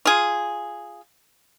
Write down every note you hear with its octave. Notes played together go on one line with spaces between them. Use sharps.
F4 G#4